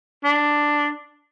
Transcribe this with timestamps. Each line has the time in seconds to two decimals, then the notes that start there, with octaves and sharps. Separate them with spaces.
0.24 D4